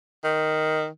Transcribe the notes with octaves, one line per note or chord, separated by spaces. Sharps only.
D#3